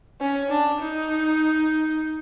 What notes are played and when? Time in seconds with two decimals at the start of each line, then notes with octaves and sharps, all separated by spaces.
0.21 C#4
0.50 D4
0.80 D#4